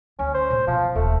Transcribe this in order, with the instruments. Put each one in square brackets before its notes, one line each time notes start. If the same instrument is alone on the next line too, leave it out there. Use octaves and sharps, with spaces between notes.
[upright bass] D2 [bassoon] C#4
[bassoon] C5
[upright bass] A#2 E3
[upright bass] B2 [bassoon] F3
[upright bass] D#1 [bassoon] A3